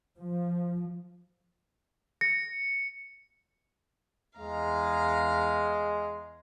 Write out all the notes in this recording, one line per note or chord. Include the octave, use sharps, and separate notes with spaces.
F3
A#6 C#7
E2 G#3 F5 A#5